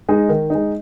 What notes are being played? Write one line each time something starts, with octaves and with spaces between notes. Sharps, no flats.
G#3 D#4
D#3
G#3 D#4